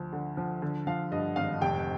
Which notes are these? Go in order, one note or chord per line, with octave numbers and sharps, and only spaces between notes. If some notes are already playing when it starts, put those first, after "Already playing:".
Already playing: D2 F3
D3
F3
D3
F3 F5
G2 D#5
G#1 F5
F1 G5